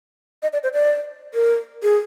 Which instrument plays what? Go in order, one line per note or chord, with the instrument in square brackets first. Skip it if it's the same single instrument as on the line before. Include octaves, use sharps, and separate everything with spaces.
[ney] D#5
D5
C5
D5
A#4
G#4